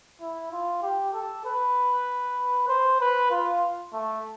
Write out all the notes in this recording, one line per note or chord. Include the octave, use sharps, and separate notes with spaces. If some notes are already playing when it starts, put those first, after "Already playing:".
E4
F4
G4
A4
B4
C5
B4
F4
A3